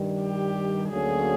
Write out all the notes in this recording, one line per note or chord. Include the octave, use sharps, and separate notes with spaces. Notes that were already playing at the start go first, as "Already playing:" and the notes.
Already playing: G2 D#3 G3
G4
D2 D3 F#3 A#3 C#4 G#4